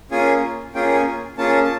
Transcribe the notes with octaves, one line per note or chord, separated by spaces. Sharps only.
A#3 C#4 F4 G#4 G#5
A#3 C#4 F4 G#4 G5
G#5
A#3 C#4 F4 G#4 A5
A5